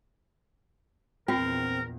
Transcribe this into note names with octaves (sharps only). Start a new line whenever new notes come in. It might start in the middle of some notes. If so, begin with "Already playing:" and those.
A#1 E2 C4 F4 A#4 G5